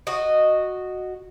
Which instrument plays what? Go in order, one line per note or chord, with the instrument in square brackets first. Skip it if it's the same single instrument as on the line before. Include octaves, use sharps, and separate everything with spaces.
[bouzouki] F#4 D#5